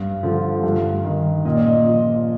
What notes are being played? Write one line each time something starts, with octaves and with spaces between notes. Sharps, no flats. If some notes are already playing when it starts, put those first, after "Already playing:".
Already playing: G2
D3 F3
G2
D#3
A#2 D#5
D5
D#5
F3